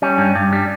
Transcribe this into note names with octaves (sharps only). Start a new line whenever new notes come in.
G3 C#4
G2
G2
G3